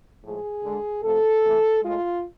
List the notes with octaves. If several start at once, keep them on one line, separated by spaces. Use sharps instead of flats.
A2 F3 G#3 G#4
D3 G#3
C3 F3 A3 A4
C3 E3 A3
A2 G#3 F4